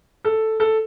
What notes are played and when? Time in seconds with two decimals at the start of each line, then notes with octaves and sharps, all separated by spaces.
0.24 A4
0.60 A4